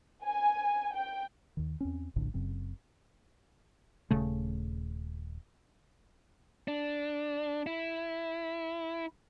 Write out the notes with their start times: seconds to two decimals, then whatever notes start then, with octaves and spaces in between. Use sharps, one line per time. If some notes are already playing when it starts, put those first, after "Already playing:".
0.25 G#5
0.95 G5
1.57 D#2 D#3
1.80 E2 C4 C#4
2.16 F1 A#1 A2 D3
2.34 F#1 F#2 C#3 C4
4.11 D#1 C#3 A3
6.68 D4
7.67 E4